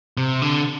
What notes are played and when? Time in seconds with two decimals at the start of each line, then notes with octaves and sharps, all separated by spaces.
0.17 C3
0.42 D3